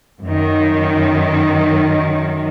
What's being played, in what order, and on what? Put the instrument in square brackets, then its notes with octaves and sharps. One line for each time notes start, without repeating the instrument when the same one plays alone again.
[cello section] F#2 D#3